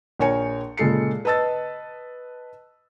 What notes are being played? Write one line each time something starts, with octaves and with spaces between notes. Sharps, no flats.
A#1 A#4 C#5 G#5 C#7
A#2 C#3 G#3 A4 C7 C#7
B4 D#5 A5 E6 A6